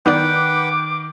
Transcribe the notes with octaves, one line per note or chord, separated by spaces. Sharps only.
D#3 B3 D#4 B4 D5 F#5 G5 D6